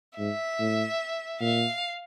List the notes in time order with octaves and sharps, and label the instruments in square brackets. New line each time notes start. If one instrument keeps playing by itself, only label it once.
[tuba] G#2 [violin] E5
[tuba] A2
[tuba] A#2 [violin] F5